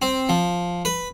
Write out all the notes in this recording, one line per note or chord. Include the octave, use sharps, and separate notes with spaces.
C4
F3
B4